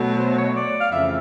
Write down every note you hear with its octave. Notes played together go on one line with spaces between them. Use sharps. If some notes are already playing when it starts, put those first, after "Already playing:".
Already playing: B2 F#3 A3
C5
C#5
D5
F5
F2 C#3 E3 A3 E5